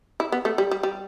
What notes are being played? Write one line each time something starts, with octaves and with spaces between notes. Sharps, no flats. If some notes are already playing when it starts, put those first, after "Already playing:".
E4
B3
A3
G3
G3
G3